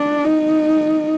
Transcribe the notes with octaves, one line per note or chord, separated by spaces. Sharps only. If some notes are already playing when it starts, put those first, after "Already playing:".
Already playing: D4
D#4